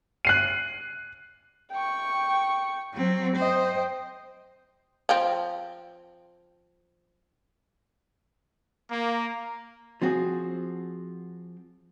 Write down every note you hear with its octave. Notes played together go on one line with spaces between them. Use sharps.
F#6 C7 D#7
G5 C#6
F#3 C4
C5 D#5 G5
F3 C4
A#3
F3 C4 F#4 G#4